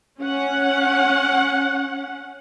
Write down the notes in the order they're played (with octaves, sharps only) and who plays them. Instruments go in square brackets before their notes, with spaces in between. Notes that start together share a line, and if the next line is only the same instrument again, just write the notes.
[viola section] C#4 F#5